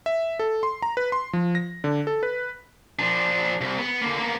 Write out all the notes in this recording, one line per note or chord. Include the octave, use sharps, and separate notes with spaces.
E5
A4
C6
A#5
B4
C6
F3
A#6
D3
A4
B4
F3 D4
C2
B3
D3 A#3
A#3 B3